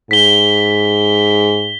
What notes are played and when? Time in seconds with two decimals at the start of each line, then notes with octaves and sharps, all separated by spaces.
0.11 G#2 B6 G7